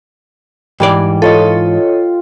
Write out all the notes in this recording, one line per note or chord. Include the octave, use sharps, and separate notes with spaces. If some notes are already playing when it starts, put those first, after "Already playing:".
G#2 E3 G3 D5
F4 A4 C#5 D#5